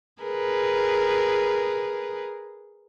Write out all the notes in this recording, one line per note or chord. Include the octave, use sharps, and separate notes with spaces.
G#4 A#4 B4